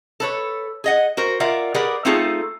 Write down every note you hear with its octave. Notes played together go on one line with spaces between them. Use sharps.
A4 B4 C#5
G#4 D#5 F#5
F#4 A#4 C5
F4 A#4 D5 E5 F#5
G4 G#4 A#4 B4 D5 F#5
A3 C4 D#4 F4 G#4 A4